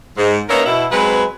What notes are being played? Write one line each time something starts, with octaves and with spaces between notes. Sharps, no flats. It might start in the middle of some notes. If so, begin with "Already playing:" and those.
G#2
A#3 B3 C#4 D#4 A#4 E5
B2 E4
F#3 G#3 C4 B4